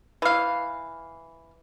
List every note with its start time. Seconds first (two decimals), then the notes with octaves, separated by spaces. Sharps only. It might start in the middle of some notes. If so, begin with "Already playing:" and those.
0.22 E3 F5